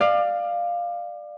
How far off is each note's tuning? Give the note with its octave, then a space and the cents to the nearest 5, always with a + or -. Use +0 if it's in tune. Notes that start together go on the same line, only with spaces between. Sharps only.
D5 +25 F5 +0